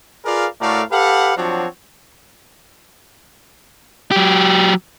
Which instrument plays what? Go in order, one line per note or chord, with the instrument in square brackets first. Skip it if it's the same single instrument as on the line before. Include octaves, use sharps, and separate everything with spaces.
[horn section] F4 G#4 A#4 B4 D5 F5
A2 A3 F#4 A#4 D5 F5
G4 A4 B4 F5 F#5
F3 F#3 C4 D4 F#4 C#5
[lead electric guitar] F#3 G4